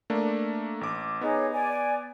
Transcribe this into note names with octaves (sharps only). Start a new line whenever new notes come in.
A3 A#3 D4
A1 D6
B3 D#4 G#4 C#5
D5 G#5